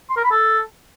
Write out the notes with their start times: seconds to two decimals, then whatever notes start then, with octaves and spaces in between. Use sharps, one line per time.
0.10 C6
0.17 A#4
0.24 B5
0.31 A4